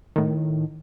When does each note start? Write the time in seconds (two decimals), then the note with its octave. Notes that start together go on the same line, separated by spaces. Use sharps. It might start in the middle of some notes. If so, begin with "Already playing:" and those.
0.16 A2 D#3